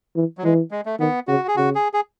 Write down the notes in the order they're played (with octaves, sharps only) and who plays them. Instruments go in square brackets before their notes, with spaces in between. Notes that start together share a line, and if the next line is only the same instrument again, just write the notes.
[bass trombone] E3
[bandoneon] F#3
[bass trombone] E3 [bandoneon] G#3
[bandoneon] G#3
A3
[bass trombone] D#3 [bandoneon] B3
[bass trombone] C#3 [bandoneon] F#4
[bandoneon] G#4
[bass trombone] C#3 [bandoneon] F#4
[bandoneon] G#4
G#4